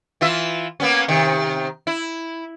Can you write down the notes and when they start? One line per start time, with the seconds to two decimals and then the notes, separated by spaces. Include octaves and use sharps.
0.21 E3 F4 E5
0.80 A#3 B3 C#4
1.08 C3 D#3
1.87 E4